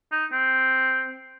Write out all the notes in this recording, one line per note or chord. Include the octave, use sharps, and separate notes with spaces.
D#4
C4